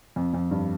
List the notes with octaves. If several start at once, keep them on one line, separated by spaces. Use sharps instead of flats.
F2
F2
G2